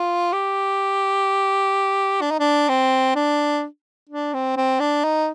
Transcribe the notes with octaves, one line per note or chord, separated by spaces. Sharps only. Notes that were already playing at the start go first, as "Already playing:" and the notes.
Already playing: F4
G4
D4
D#4
D4
C4
D4
D4
C4
C4
D4
D#4